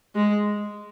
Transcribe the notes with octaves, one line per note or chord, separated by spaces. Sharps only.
G#3